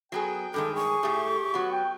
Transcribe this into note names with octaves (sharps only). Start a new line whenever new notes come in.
F#3 B3 G#4 G5
G2 D#3 G#3 A4
G#4 C#6
A2 A3 G4
F#3 B3 F#4
G5